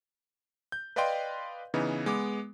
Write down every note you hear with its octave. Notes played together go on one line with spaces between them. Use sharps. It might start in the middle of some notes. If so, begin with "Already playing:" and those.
G6
B4 D5 D#5 F5 G5 C6
C#3 E3 B3 D#4
G#3 B3 D6